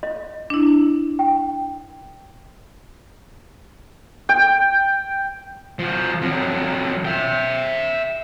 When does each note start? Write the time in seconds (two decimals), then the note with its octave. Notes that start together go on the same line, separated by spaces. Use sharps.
0.03 D#5
0.50 D4 E4
1.19 G5
4.29 G5
5.79 F3 F#4
6.22 F2 F#3
7.05 E5 G5